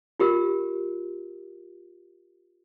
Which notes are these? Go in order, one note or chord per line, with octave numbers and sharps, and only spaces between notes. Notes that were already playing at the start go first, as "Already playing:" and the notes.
F4 G4 A#4